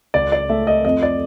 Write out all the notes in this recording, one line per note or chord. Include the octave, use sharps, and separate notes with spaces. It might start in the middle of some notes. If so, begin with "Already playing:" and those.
C#2 D5
D5
A3 E5
D#5
F2 D#5
D5